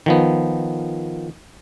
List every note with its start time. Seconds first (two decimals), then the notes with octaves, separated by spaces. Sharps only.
0.06 D#3 F3 B3